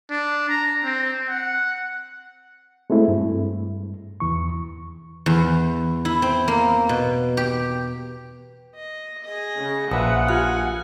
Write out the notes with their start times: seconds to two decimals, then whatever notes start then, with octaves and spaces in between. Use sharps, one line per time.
0.10 D4
0.50 A#5
0.84 C4
1.29 F#5
2.90 G#3 A3 C4 E4
3.08 G2
4.20 E2 E3 C#6
5.26 E2
6.05 E4
6.22 C4
6.48 A#3
6.89 B2
7.37 G4
8.75 D#5
9.24 G#4 D#5
9.56 C#3
9.91 A#1 F4 B4 E5 F#5 D#6
10.28 F4 G4 G#5 F6